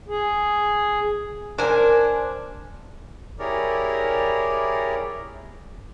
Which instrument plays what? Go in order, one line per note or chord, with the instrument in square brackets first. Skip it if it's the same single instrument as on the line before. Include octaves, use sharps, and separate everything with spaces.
[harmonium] G#4
[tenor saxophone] D4 [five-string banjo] A#4 [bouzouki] C5 G#5
[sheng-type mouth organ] E4 G4 G#4 A#4 C#5 D5